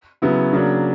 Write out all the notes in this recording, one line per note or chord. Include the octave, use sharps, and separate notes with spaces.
C#3 F#3 B3 E4
C#3 F#3 A#3 D4